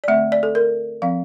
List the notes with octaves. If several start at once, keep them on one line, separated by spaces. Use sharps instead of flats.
D5
D3 A3 C4 E5
D5
A4
A#4
F3 C4 F5